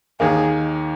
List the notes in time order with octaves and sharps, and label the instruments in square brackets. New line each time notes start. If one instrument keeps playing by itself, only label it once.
[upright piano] D#2 D#3 A#3 [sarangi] G#4